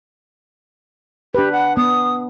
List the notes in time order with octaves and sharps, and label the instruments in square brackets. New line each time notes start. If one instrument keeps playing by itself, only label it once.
[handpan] D4 B4 [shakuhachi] G4
[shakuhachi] F#5
[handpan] B3 [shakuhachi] D#6